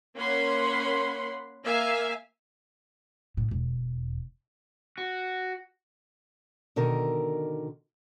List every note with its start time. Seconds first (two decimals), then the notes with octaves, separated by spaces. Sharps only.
0.16 A#3 C#4 F#5 B5 C6
1.64 A#3 E5 F5 G#5
3.37 A2
3.51 E1
4.98 F#4
6.76 B2 D3 D#3 A#4